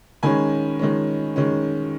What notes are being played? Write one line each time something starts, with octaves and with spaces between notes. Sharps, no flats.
D#3 G#3 C#4 G#5 B5
D#3 G#3 C#4
D#3 G#3 C#4